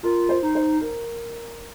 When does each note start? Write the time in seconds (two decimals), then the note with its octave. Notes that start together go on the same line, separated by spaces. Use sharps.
0.03 F4 A#4
0.29 C5
0.43 D#4
0.55 C5
0.81 A#4